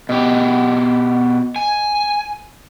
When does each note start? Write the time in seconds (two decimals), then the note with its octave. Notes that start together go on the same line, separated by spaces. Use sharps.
0.09 B2 G4 D#5
1.56 G#5